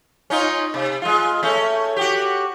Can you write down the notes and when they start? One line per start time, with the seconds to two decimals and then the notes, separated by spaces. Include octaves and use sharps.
0.30 C#4 D#4 F4
0.74 C3
1.02 G#3 F4
1.43 A3 C#4
1.96 F#4 G4